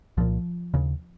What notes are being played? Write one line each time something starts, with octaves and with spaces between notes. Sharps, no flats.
C2 A#2 F3
D#2 C#3